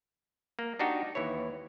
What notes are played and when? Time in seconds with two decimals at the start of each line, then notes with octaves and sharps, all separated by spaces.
0.59 A#3
0.79 D4 D#4 F#4 G4
1.15 D#2 E3 E4 C#5